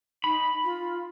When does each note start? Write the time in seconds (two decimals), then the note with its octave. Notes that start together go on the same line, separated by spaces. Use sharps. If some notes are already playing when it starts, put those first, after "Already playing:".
0.24 D#4 B5
0.64 F4